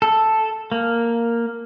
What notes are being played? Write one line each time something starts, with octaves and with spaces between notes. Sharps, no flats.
A4
A#3